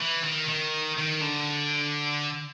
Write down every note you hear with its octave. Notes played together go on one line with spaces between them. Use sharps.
E3
D#3
D#3
D#3
D3